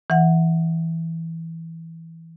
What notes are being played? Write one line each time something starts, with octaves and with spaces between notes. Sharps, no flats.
E3 F#5